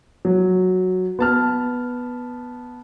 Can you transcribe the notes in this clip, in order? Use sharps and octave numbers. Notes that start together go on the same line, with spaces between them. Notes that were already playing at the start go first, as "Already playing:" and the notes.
F#3
B3 A5 F6